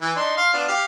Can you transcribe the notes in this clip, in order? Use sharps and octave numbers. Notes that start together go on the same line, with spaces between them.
E3
D4 D#4 C6
F5 C6
B3 D4 F4
G4 F5